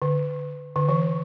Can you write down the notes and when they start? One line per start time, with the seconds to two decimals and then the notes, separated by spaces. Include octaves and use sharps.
0.02 D3
0.76 D3
0.89 E3